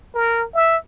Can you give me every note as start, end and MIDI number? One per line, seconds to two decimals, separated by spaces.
0.14 0.45 70
0.54 0.77 76